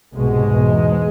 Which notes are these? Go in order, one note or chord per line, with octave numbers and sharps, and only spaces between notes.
C2 G#2 B2 G#3
E2 B2